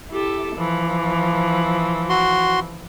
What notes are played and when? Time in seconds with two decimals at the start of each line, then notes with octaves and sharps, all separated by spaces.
0.11 E4 G4 A4
0.57 E3 F3
2.09 F#4 C6